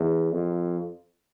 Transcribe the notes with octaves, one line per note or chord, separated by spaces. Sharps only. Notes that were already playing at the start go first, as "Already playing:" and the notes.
Already playing: E2
F2